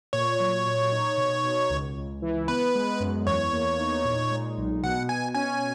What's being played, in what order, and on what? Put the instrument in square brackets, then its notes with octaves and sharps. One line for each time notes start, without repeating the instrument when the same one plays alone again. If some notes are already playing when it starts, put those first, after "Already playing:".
[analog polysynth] A#2 [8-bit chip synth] C#5
[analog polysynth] F#3
A#2
D#4
B2
B2
C#2
C#2
E3
[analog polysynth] B3 [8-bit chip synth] B4
[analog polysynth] G#3
F#2
[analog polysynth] E2 [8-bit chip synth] C#5
[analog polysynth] A#3
D#4
A#2
G#3
B1
[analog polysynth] B2 [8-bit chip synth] F#5
[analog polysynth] B2 [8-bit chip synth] G#5
[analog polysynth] C#4 [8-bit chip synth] G#5